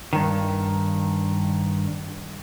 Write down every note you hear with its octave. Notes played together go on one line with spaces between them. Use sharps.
G2 D#3